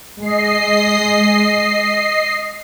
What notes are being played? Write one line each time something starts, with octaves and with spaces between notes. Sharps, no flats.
G#3 D#5 C7